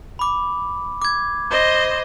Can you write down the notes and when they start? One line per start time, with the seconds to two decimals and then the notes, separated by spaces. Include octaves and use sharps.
0.19 B5 D6
1.02 D6 G#6
1.50 C5 D#5